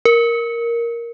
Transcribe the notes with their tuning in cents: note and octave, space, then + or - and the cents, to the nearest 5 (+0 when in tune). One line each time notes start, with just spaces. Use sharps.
A#4 +5